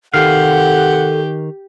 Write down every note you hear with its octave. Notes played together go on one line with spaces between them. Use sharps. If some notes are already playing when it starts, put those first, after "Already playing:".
C3 D#3 G4 A4 C5 F5 F#5